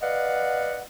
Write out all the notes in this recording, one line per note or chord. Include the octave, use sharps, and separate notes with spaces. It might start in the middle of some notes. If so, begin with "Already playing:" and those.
B4 D5 D#5 F5 F#5